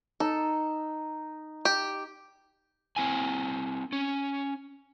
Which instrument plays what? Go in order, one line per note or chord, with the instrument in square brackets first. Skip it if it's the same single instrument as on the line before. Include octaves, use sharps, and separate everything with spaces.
[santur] D#4 [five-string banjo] A4
[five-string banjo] G4
[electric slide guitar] C4 E4 G#5
C#4